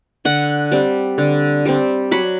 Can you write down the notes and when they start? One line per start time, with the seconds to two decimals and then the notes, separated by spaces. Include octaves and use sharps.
0.25 D3 F#5
0.72 G3 C4
1.18 D3
1.65 G3 C4
2.11 F#3 B5